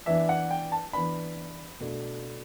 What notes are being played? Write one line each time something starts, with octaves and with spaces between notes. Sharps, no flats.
E3 B3 D4 E5
F#5
G5
A5
E3 B3 D4 B5
B2 A3 D4